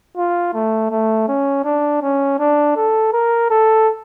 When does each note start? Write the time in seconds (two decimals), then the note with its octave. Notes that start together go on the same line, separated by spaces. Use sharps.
0.17 F4
0.54 A3
0.91 A3
1.28 C#4
1.65 D4
2.02 C#4
2.39 D4
2.76 A4
3.13 A#4
3.50 A4